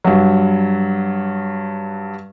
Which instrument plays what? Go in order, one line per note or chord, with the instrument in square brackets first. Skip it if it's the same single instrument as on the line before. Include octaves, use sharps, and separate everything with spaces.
[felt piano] G2 F#3